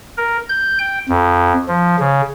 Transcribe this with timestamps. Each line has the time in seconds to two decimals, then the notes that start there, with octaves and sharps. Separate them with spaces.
0.18 A#4
0.49 G6
0.79 G5
1.09 F2
1.68 F3
1.99 C#3